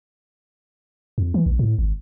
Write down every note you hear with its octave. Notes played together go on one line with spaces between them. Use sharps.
F2
E3
A#1
A2
G#1